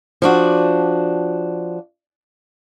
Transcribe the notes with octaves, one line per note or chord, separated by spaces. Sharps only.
F3 D4 F#4